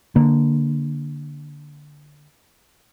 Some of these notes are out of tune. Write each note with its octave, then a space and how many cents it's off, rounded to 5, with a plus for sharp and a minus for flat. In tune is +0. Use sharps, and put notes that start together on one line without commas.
D3 +5 A#3 +0